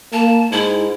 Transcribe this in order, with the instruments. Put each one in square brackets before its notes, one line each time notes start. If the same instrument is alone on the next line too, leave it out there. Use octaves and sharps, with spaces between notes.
[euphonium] A#3 [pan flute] A5
[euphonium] G#2 [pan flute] E4